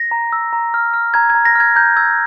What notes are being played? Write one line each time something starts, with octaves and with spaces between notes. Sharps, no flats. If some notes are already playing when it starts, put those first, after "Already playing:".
Already playing: A#6
A#5
E6
A#5
F6
F6
A#5 G#6
G#6
A#5
A#6
F6 G#6
A#5 G6
E6 G#6